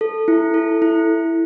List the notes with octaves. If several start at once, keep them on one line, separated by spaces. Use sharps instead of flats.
A4
E4
A4
E4